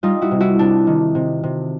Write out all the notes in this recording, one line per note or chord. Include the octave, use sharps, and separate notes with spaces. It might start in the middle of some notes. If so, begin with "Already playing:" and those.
G3 D#4 F4
E4 F#4
C3
E4 F#4
C3 D4
D#3
C3
C3